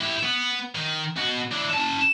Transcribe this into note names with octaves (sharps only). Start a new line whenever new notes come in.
E4 G4
B3
D#3
B2 F#4
D4 E4
C#4 A5